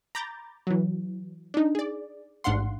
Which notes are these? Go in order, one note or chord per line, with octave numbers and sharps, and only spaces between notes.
A#5 B5 D6 G6 A6
E3 F#3
D4 D#4
G#4 D5
A1 G#2 D4 F5 F#5 C6